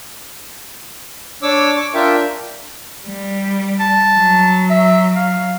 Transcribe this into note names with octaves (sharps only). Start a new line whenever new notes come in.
D4 C#5 D6 E6
C#6 D6
D4 F4 A#4 E5 G5
G3
A5
F#3
E5
F5